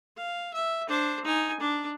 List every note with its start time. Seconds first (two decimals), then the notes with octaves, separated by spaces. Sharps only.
0.17 F5
0.54 E5
0.89 D4 C5
1.25 D#4 G#5
1.61 D4